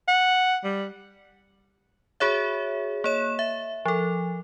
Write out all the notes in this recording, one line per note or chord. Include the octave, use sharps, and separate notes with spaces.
F#5
G3
F#4 G#4 C#5 E5
A#3 C#5 E7
E5
F3 A4